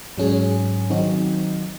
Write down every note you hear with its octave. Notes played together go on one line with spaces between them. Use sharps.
G#2 F#3 C#4 G#4
D#3 F#3 C4 D#4 F#4